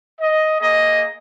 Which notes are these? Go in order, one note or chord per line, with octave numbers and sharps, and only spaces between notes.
D#5
A#3 G#4 D#5